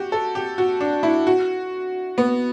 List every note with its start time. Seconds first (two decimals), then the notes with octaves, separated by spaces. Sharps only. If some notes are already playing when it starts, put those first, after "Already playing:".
Already playing: F#4 G4
0.12 A4
0.35 G4
0.58 F#4
0.81 D4
1.03 E4
1.27 F#4
2.18 B3